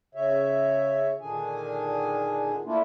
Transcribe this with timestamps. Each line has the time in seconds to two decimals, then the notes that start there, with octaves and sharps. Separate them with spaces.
0.15 C#3 C#5 E5
1.21 A#2 D3 D#3 D4 G#4 G#5
2.65 A3 A#3 D4 E4 F4